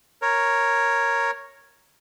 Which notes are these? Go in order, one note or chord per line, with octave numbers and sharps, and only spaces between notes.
A#4 C#5